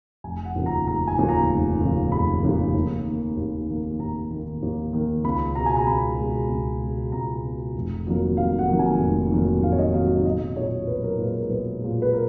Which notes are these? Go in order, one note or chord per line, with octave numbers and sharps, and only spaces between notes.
F1 G#5
F#5
D#2 C#3 F3
A#5
F1 A#5
G#5
D#2 C#3 F3
A#5
F1
D#2 C#3 F3
F1 B5
D#2 C#3 F3
D#2
D#3 A#3
D#2
D#3 A#3
D#2 A#5
D#3 A#3
D#2
D#3 A#3
C#2 B5
B2 G#3 A#5
G#5
A#5
C#2 B5
B2 G#3
C#2
B2 G#3
C#2 A#5
B2 G#3
F1
F2 D#3 F#3 A#3
F1 F5
F#5
F2 D#3 F#3 A#3
G#5
F1
F2 D#3 F#3 A#3
F1 F5
C#5
D#5
F2 D#3 F#3 A#3 F5
D#5
B1 D#5
A#2 G#3 C#5
B1 B4
A#4
A#2 G#3 B4
A#4
B1 B4
A#2 G#3
B4
A#4